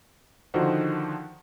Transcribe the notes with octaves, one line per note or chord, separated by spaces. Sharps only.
D3 D#3 F3 D#4 F#4 C5